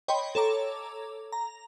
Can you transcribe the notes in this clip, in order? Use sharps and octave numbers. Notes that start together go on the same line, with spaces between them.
C#5 D#5 G5 B5 C6
A4 C#5 A#5 D6
A#5